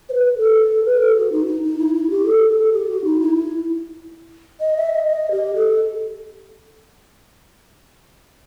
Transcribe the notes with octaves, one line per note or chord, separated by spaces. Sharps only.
C5
B4
A4
B4
A4
F#4
D#4
D#4
D#4
E4
E4
G4
A4
A4
G4
F#4
D#4
E4
E4
D#5
E5
D#5
D#5
G4
A4